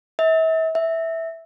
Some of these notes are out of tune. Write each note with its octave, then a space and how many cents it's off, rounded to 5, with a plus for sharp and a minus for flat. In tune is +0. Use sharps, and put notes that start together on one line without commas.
E5 -40
E5 -10